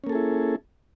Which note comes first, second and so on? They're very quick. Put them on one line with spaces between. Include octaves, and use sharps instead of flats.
C#4 A#3 A4 G#4 E4